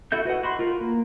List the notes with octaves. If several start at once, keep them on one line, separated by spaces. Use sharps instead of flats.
E4 F#4 A4 E5 G6
F#4 B4 D#5 F#5
F#4 B5 C6
F4 A#4
A#3